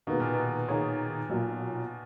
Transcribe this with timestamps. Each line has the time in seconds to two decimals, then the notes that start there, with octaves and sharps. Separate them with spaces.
0.07 B2 D#3 A#3 D#4 G#4 B4
0.20 A#2
0.34 B2
0.68 D#3 A#3 D#4 G#4 C#5
1.30 B1 A#2 F#3 A#3